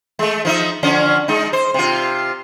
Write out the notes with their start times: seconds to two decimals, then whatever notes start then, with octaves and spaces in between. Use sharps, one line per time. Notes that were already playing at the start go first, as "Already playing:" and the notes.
0.19 G#3 A3
0.45 F3 D#4 E5
0.83 D3 F3 C#4
1.28 G#3 D#4
1.53 C5
1.74 C3 F4